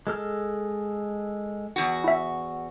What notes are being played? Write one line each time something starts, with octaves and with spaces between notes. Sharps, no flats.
G#3 A4 F6
E2 F#4
E4 E5